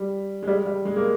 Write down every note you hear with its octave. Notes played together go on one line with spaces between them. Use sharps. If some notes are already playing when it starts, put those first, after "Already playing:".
Already playing: G3
G#3
G3
G3
G#3
A#3